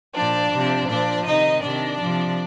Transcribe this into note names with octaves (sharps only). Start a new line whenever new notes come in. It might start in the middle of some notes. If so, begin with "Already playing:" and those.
A#2 F3 D4 D5
C3 F3
A#2 F3 D4 D5
C3 D#3 D#4 D#5
C3 D#3 D4 D5
C3 F3